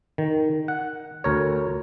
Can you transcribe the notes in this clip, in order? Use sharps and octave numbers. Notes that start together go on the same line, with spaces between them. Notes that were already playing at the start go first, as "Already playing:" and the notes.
D#3
F#5
D2 A#4 C#5